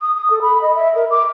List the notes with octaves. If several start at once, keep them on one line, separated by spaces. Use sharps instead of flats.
D#6
D#6
A4
B5
D#5
E5
A#4
D6